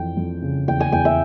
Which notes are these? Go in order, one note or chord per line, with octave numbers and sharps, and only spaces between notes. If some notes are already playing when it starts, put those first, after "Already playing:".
Already playing: F2 E3 G5
F2
C#3
E2 G5
G#5
E2 G5
E5